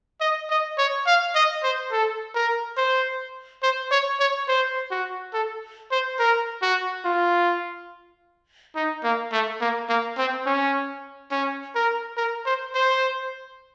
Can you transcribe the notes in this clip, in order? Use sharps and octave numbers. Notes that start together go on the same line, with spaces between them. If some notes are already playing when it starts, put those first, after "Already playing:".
D#5
D#5
C#5
F5
D#5
C5
A4
A#4
C5
C5
C#5
C#5
C5
F#4
A4
C5
A#4
F#4
F4
D#4
A#3
A3
A#3
A#3
C4
C#4
C#4
A#4
A#4
C5
C5